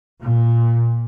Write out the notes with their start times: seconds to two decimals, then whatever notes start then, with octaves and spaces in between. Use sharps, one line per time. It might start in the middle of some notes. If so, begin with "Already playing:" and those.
0.22 A#2